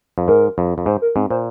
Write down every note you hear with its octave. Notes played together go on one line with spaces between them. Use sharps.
F2
G#2 A#4
F2
F2
G#2 C5
A#4
G#2 C4
A#2 C5